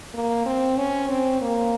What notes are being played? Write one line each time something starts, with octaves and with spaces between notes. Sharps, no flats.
A#3
C4
C#4
C4
A#3